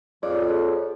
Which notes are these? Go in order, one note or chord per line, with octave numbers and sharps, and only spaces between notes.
F2 G#4 C#5 D5